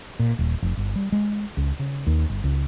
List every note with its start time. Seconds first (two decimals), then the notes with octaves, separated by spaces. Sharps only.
0.19 A#2
0.39 D#1
0.62 F1
0.77 G1
0.96 G3
1.12 G#3
1.57 C#2
1.79 C#3
2.07 D#2
2.30 G1
2.44 C#2